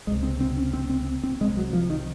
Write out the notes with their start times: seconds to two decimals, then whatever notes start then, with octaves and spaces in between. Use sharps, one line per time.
0.07 C#2 C3 G#3
0.23 C4
0.41 C4
0.57 C#4
0.74 C4
0.90 C4
1.24 C4
1.41 C2 C3 G#3
1.57 F#3
1.73 F3
1.90 D#3